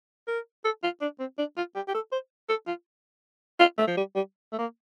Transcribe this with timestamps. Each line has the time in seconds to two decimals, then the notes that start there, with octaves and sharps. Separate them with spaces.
0.28 A#4
0.65 A4
0.84 F4
1.02 D4
1.20 C4
1.38 D4
1.57 F4
1.75 G4
1.88 G4
1.94 A4
2.12 C5
2.49 A4
2.67 F4
3.60 F4
3.78 A3
3.87 F3
3.97 G3
4.15 G3
4.53 A3
4.59 A#3